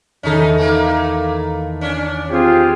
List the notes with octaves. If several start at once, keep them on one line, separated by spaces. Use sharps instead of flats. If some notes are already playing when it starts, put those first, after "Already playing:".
E2 D#3 C#4 D#4 A4
A3 A#3
C#4 D4
C4 F4 G4 G#4